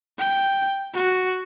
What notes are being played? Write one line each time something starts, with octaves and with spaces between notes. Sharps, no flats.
G5
F#4